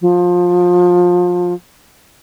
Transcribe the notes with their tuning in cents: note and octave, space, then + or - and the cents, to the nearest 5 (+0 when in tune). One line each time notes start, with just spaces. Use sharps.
F3 +25